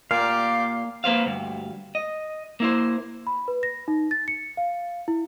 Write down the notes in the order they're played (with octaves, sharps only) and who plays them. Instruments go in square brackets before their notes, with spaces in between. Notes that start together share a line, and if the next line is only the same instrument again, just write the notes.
[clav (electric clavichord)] A#2 [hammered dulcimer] A#3 [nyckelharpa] G4 D5 [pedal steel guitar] F5
[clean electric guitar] A#3 B4 C5 F5
D2 G2
D#5
A#3 E4 C5
[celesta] B5
B4
A#6
D#4
A6
C#7
F5
E4